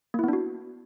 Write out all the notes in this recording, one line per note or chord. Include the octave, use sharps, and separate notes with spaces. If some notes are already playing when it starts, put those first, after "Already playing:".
A#3 B3 D4 E4 F#4